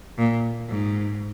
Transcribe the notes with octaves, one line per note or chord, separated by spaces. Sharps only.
A#2
G#2